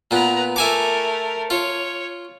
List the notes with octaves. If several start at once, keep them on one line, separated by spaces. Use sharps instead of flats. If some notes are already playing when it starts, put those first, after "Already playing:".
A#2 B3 B4 A#5
A3 A#4 E5 G#5 D6
F4 C#5